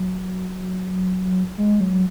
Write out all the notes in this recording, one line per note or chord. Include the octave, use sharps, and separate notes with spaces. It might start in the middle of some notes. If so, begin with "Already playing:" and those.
Already playing: F#3
G#3
F#3